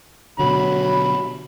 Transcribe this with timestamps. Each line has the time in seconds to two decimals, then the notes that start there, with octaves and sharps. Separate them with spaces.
0.39 B2 D3 F#3 B5